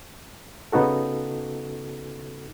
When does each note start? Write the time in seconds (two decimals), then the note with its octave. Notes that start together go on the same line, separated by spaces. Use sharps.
0.72 C#3 B3 D#4 F#4 A4